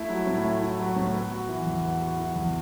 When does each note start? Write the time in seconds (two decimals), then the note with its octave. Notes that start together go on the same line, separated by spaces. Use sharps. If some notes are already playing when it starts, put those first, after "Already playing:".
Already playing: A3 E4
0.09 F#3
0.27 A2
0.44 A3
0.62 E4
0.79 F#3
0.96 A2
1.14 B3
1.31 F#4
1.48 E3
1.67 E2
1.83 B3
2.01 F#4
2.19 E3
2.36 E2